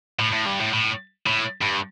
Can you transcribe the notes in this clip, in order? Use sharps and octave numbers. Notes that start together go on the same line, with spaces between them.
A2
A2
G2
A2
A2
A2
G2